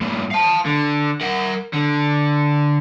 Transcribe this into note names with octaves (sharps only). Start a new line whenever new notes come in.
G2 A#2
F5 A5
D3
A#4 F#5
D3